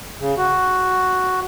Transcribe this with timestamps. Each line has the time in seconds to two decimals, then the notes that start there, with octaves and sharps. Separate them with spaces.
0.20 C#3
0.38 F#4